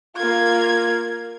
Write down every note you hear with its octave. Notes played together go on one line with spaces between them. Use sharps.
A#3 F4 G#6